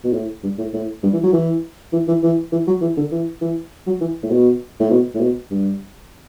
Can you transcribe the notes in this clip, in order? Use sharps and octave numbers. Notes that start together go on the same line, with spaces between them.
B2
A2
G2
A2
A2
G2
E3
F#3
E3
E3
E3
E3
E3
F#3
E3
D3
E3
E3
F#3
E3
A2
B2
A2
B2
A2
B2
G2